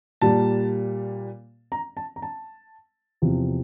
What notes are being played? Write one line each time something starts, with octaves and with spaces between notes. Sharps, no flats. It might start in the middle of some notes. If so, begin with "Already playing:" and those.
A#2 G3 A#3 A5
A#5
A5
A#5
A5
E2 C3 F3